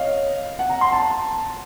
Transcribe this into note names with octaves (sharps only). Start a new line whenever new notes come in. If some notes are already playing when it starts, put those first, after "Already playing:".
Already playing: C#5 D#5 F5
F#5
A#5
C6
A5